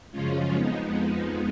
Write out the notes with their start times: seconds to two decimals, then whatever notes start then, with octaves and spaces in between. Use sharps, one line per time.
0.12 F#2 C#3 F3 G#3 C#4 F4
0.54 F2 F3 G#3 B3 D#4